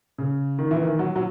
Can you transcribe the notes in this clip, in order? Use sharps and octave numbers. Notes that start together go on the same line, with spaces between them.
C#3
D#3
E3
D#3
F#3
F#3